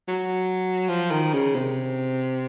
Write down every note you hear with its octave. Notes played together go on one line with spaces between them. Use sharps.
F#3
F3
D#3
C#3
C3